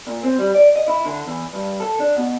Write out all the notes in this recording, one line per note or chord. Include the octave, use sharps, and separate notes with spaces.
A#2
C4
G3
D5
D#5
E4
D3
E2
G2
A4
D4
B2